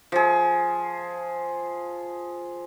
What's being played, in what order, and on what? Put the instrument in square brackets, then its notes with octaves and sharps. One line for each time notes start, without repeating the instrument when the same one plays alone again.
[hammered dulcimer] F3 G#4